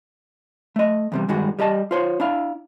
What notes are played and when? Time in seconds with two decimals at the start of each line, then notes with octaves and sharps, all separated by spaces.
0.76 A3 D#5
1.12 E2 C3 G3
1.28 G2 D#3 G#3 F#4
1.59 G3 G4 D#5 A5
1.91 F4 C5 C#5
2.20 D4 E4 F5